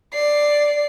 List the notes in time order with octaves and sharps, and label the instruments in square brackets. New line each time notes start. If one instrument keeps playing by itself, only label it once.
[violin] D5 C7